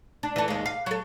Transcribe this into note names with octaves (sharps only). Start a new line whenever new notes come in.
D4
E3 A4
D#2 G#3
F5
F#3 A4